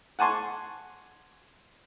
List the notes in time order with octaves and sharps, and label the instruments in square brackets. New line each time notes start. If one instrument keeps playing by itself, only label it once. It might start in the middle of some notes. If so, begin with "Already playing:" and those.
[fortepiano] F#5 G#5 A5 C6 C#6